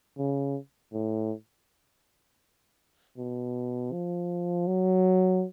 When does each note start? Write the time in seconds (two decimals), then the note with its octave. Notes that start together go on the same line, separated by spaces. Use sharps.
0.18 C#3
0.93 A2
3.18 B2
3.92 F3
4.67 F#3